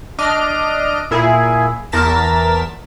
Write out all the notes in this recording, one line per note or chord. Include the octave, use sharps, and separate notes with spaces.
D4 D#5 F6 D7
A#2 E4 G#4
E2 A#4 A5 A6 B6 E7